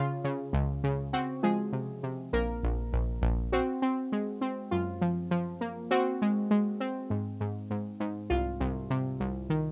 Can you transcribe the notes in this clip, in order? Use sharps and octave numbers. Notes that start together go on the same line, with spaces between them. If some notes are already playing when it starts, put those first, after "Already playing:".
Already playing: C#3 F4
C#3
C#2
C#3
C4 F#4
F3 G#3 G#4
C3
C3
A#1 A#3 A#4
A#1
A#1
A#1
C4 F#4
C4
G#3
C4
F#2 F4
F3
F3
A#3
C4 F#4
G#3
G#3
C4
G#2
G#2
G#2
G#2
C2 F4
C2
C3
C2
D#3